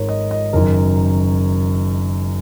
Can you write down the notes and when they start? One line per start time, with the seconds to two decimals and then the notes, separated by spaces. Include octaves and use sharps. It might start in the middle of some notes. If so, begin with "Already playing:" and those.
Already playing: G#1 G#2 A#4 C#5
0.09 D#5
0.31 D#5
0.53 F#1 F#2 D#3 A#4